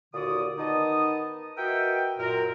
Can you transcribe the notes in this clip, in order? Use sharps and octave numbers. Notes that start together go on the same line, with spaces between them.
D#2 A#2 D3 F#4 D5 D#6
D#3 B3 D#4 D#5 A5 D#6
F#4 A#4 B4 D#5 E5 G5
F#2 A#2 A#4